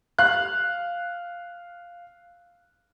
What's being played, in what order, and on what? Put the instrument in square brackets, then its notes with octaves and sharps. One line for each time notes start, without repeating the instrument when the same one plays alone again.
[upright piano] F5 F#6